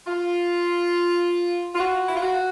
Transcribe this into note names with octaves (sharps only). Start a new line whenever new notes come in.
F4
F4
F#4
E4
F4
F#4